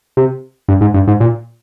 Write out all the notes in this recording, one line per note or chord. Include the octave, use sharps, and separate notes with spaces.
C3
G2
G#2
G2
G#2
A#2